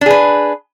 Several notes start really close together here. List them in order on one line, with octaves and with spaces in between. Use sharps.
D4 G#4 B4